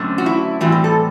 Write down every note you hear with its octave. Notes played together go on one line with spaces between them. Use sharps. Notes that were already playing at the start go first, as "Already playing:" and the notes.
Already playing: F#2 D3 A3 C4
F#4
E4
A2 E3 G3 C4 F#4
G4
A4